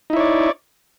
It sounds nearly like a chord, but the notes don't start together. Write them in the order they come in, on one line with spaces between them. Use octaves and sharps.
D#4 E4 C#5 D5